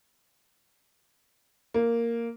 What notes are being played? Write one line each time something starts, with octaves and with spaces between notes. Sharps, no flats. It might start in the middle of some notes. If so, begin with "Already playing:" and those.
A#3